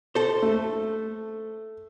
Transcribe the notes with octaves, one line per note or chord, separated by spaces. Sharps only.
A4 C5
A3